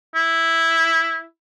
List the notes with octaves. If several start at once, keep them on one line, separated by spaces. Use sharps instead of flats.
E4